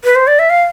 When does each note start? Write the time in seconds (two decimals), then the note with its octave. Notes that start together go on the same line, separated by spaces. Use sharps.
0.04 B4
0.16 C5
0.27 D5
0.39 E5
0.50 F5